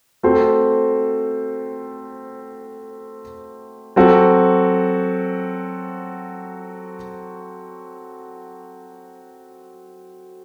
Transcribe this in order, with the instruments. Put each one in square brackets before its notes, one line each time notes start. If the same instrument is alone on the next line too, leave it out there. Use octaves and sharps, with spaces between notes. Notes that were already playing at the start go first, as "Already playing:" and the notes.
[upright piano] A3 C4 F#4 A4 C5
F#3 C4 F#4 A4